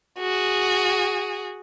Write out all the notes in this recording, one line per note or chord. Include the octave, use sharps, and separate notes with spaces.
F#4 G#4